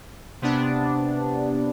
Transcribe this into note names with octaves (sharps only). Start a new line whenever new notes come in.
C3 B3 D4